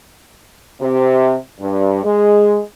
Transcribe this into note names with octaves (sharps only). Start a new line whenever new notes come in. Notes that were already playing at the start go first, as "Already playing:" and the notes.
C3
G2
G#3